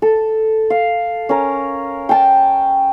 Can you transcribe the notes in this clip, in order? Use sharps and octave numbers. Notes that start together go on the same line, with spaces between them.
A4
F5
C#4 A#4
G5 A5